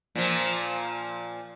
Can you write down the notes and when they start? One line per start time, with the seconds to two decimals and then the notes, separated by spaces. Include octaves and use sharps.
0.15 A#2 F3